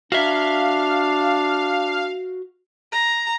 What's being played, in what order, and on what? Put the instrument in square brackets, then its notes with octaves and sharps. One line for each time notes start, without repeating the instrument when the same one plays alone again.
[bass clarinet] D4 [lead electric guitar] F#4 E5 [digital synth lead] F5
[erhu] A#5